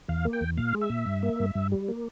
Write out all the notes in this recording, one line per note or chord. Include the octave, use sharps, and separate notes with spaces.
E2 F5
A#3
G5
E2
A#2 F5
G#3
E5
A#2
G2
A#3
G2
G2
G3
A#3